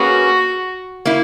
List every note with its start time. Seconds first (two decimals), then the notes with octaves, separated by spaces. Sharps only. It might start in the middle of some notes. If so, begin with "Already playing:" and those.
Already playing: A#3 C#4 F#4 G#4 B4
1.05 A#3 E4